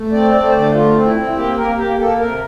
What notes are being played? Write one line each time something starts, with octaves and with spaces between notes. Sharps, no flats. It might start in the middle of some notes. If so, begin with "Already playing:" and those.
Already playing: A3
C4 D5
A3 D5
C5
D3 D5
A3 F4
C4
E4
C4
A#3 G4
A#3 A#4
A#3 G4
A#3 A4
C3 A#4